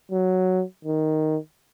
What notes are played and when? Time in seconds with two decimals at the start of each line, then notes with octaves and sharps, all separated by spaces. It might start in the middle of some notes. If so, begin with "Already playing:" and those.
0.11 F#3
0.85 D#3